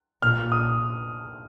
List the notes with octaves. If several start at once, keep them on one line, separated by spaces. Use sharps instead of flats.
A#2 F6
D#6